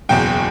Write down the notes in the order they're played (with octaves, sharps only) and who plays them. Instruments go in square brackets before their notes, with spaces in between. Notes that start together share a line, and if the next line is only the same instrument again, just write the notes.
[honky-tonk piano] F#1 E2 B2 F#3 G5